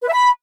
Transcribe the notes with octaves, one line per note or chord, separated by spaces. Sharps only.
B4
E5
B5